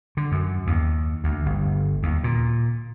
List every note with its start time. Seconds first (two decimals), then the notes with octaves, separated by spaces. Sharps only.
0.17 D3
0.32 F#2
0.67 D#2
1.24 D2
1.46 G1
2.03 D#2
2.24 A#2